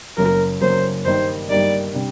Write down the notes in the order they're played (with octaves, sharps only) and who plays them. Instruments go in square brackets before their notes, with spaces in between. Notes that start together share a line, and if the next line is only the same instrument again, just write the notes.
[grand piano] F#1 F#2 F#3 A#3 [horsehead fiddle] A#4
[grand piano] F#1 F#2 F#3 A#3 [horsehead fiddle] C5
[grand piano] G2 D#3 G3 A#3 D#4 [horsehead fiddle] C5
[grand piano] G2 D#3 G3 A#3 D#4 [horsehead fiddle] D5
[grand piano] C3 G3 D4